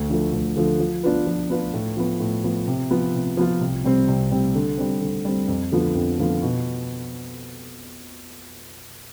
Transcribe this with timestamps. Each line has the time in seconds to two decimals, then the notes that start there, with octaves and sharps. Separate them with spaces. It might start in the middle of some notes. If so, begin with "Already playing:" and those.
Already playing: D2
0.10 D3 F3 A3
0.33 D2
0.56 D3 F3 A3
0.80 F3
1.03 B3 D4 F4 B4
1.27 F3
1.50 B3 D4 F4 B4
1.74 A2
1.97 F3 B3
2.20 A2
2.44 F3 B3
2.68 C3
2.91 F3 B3 F4
3.14 C3
3.37 F3 B3 F4
3.61 C2
3.84 C3 G3 C4
4.08 C2
4.31 C3 G3 C4
4.55 D3
4.78 G3 C4
5.01 D3
5.25 G3 C4
5.48 F2
5.72 D3 F3 B3 F4
5.95 F2
6.19 D3 F3 B3 F4
6.42 B2